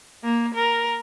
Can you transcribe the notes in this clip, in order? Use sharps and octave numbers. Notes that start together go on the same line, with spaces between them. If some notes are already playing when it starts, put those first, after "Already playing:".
A#3
A#4